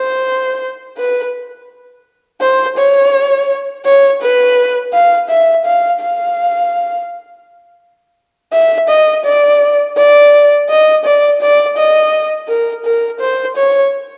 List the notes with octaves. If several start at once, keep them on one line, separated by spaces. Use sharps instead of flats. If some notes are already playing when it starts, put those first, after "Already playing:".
Already playing: C5
B4
C5
C#5
C#5
B4
F5
E5
F5
F5
E5
D#5
D5
D5
D#5
D5
D5
D#5
A#4
A#4
C5
C#5